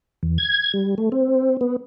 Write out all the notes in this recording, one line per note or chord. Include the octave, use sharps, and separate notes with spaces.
E2
G#6
G3
A3
C4
B3